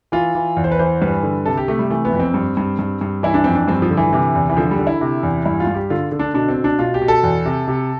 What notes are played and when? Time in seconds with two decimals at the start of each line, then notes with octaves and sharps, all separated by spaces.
0.12 E3 F4
0.35 E3
0.56 E2
0.64 C5
0.72 B4
0.79 E3 C5
1.02 G2 B4
1.23 D3
1.45 C3 A4
1.57 G4
1.68 C3 A3
1.79 G3
1.90 E3 A3
2.05 B3
2.13 F2
2.20 C4
2.34 G2
2.57 G2
2.79 G2
3.01 G2
3.23 E3 E4
3.34 D4
3.44 F2 C4
3.55 D4
3.68 G2 C4
3.82 F3
3.90 D3
3.97 E3
4.13 C3 E3
4.35 E2
4.50 E3
4.57 D3 F3
4.71 G3
4.79 D3
4.87 E4
5.01 C3
5.23 E2
5.46 G2 E4
5.60 F4
5.67 G2
5.75 G4
5.90 D3 F4
6.12 D3
6.19 D4
6.34 B2 D4
6.49 C4
6.56 B2
6.64 D4
6.79 B2 F4
6.94 G4
7.02 B2
7.08 A4
7.23 E2
7.46 C3
7.68 C3